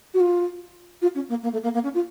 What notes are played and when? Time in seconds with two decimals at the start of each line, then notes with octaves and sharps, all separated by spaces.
0.14 F#4
0.20 F4
1.02 F4
1.15 C#4
1.29 A#3
1.43 A#3
1.52 A3
1.63 A#3
1.74 A#3
1.84 C#4
1.95 F4